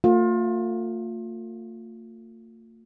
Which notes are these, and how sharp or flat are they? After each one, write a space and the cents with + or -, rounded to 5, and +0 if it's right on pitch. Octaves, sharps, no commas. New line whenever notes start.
A3 +45 F4 +30